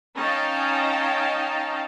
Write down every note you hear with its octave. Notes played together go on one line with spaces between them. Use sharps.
C#4 D#4 D#5 F5 G5 A5